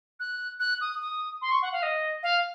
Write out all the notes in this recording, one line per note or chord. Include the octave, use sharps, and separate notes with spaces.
F#6
F#6
D#6
D#6
C6
C#6
F#5
F5
D#5
F5